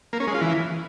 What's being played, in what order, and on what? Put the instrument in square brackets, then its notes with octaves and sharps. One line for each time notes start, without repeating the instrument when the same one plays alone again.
[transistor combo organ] A#3
C#4
G#3
F4
E3